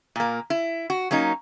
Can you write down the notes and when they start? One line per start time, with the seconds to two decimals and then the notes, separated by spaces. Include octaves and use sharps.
0.16 A#2 A#3
0.50 E4
0.90 F#4
1.11 F#3 A#3 C#4 D#4